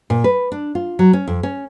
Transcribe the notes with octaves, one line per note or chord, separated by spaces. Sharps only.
A#2
B4
D4
F4
F#3
C#4
F2
C#4